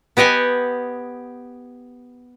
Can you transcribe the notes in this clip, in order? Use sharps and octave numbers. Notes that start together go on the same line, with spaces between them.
B3 G4 D#5 F#5 G#5